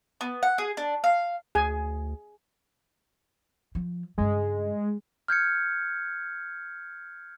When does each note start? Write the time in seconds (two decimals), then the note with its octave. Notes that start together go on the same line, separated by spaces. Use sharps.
0.21 B3
0.43 F#5
0.58 G#4
0.77 D4
1.04 F5
1.55 D2 G#4 G#5
3.75 F3
4.18 G2 C#3 G#3
5.28 F6 G6 G#6 C#7